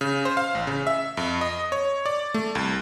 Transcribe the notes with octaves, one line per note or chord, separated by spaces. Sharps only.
C#3
C5
F5
A1
C#3
E5
F2
D#5
C#5
D5
A3
C2